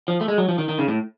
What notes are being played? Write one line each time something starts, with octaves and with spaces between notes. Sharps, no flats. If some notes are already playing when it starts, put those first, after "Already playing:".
F3
A3
G#3
F#3
F3
D#3
D#3
C#3
A2